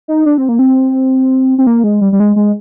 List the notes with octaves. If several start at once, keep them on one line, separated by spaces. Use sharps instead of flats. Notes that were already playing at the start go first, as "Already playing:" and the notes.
D#4
D4
C4
A#3
C4
C4
A#3
G#3
G3
G3
G#3
G#3